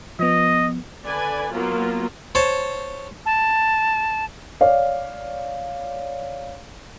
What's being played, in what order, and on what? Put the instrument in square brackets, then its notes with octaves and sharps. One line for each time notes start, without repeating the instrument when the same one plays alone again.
[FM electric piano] F3 B3 [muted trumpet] D#5
[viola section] D3 B4 D5 G#5
F#3 A#3 B3 F4
[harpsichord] C5 C#5 A5
[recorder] A5
[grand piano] C#5 D5 F5